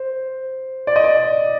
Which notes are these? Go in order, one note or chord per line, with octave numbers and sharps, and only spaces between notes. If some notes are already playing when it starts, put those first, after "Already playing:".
Already playing: C5
D5
D#5
D5